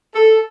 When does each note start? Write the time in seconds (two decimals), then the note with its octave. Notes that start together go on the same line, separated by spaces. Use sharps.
0.14 A4